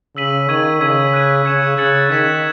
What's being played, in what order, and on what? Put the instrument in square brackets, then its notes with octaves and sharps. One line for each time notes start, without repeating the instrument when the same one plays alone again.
[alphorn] C#3 [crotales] E6 B6 D#7 F#7
[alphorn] D#3 [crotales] C#6 G#6 D#7 F#7
[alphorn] C#3 [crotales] E6 G#6 B6 D#7
[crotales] F#6 B6 D#7
[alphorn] C#3 [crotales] G#6 C#7 E7
[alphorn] C#3 [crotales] F#6 A6 C#7 F#7
[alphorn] D#3 [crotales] G#6 B6 E7